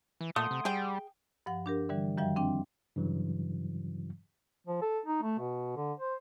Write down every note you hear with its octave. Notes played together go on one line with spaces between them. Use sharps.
E3
A#2 A3 F#5 C6 D#6
C3
G3 G#4 G5
G2 F3 F#5
D4 G4 A#4
D3 E3 G3
F#2 D#3 F3 G3 E5 G5
C4 D4 G5
G2 C#3 E3 F#3
F3
A4
D#4
A3
B2
D3
C5